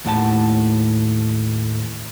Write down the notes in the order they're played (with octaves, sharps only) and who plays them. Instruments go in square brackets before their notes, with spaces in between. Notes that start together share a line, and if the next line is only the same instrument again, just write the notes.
[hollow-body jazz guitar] D#2 A2 F#5 A5